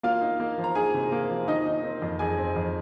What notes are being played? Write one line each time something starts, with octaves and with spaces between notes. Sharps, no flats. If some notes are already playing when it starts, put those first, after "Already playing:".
A#3 F4 F5
D#4
A#3
F3
A#5
D#4 G#4 G#5
C3
A#3
F3
D#3 D#4 D#5
D#4
C4
F2
F2 G#4 G#5
C4
F2